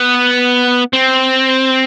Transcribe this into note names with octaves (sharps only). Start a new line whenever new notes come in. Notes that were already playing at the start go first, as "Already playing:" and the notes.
Already playing: B3
C4